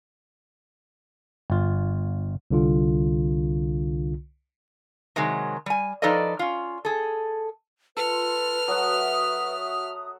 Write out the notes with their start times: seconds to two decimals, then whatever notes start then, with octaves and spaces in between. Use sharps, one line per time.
1.50 G1 F4
2.51 C2 D3 F4
5.16 C3 D#3 F#3 G#3
5.66 G3 G#5
6.02 F3 D#4 A4 B4 D5 D#5
6.39 C#4 F4
6.85 G#4 A4
7.97 F4 A4 B4 F6
8.68 F#3 F#4 E5 F#5 D#6